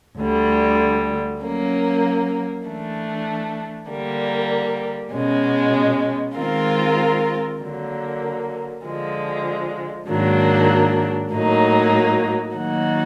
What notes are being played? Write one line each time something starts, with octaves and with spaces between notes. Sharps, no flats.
D2 D3 G3
F#3 A#3 C#4
E3 A3 D4
D3 G3 A#3
B2 G#3 C#4
D#3 G#3 C4 F4 A#4
D3 F#3 A#3
D3 F3 G#3
G#2 D#3 F#3 A#3 D4
A2 F#3 A#3 D#4
D#3 F#3 A#3 D#4 F#4